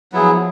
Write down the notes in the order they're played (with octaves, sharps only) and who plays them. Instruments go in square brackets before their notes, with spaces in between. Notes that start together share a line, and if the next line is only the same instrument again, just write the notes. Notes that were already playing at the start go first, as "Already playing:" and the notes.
[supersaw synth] F3 [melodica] F#3 B3 E4 G#4